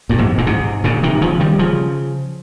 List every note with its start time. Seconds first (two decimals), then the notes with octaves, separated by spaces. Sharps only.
0.09 G2 A#2
0.18 F2 G#2
0.38 G2 A#2
0.47 G#2 C3
0.84 A#2 C#3
1.03 C3 D#3
1.21 C#3 F3
1.40 D#3 G3
1.59 C#3 F3